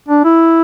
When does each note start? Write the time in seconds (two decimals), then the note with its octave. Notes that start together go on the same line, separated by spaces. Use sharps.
0.08 D4
0.24 E4